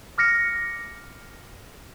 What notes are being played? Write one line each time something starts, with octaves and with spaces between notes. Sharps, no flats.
D6 F6 A#6 C#7